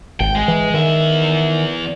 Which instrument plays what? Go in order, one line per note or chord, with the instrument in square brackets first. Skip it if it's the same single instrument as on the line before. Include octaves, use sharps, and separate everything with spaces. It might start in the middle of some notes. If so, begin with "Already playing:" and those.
[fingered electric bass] G#1 [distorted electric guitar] G5
[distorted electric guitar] G#3
[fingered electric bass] E3
[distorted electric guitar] E2 E5 [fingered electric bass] D#3